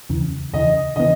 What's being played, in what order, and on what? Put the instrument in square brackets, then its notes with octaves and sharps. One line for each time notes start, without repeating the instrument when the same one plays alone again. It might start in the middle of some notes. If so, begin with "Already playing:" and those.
[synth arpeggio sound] E2 C#3 E3
[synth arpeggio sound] E2 C#3 E3 [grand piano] D#5
[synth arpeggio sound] C#3 E3 B3 [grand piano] D#5